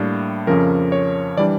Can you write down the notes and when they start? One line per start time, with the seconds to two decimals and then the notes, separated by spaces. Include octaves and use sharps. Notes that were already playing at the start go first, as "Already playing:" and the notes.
Already playing: A2 G3 A#3 D4
0.47 F2 C#3 F3 C#4 A#4
0.92 C#5
1.38 E3 G3 D4 D5